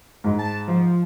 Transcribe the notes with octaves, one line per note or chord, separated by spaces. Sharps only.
G#2
A5
F3